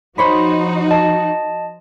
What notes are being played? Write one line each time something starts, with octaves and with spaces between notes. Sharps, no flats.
F3 D#4 F#4 C5 C#5 B5
D#5 A5